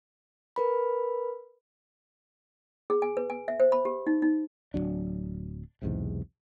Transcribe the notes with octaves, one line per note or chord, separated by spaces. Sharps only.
A#4 B4 B5
G#4
G#5
B4
G#5
E5
C5
B5
G4
D#4
D#4
D1 D#2 F#3 D4
B1 E2 G#2 C3